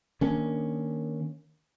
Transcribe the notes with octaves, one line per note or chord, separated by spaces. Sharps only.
D#3 A#3 C#4 D4